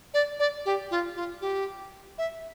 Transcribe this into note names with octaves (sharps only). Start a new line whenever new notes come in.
D5
D5
G4
F4
F4
G4
E5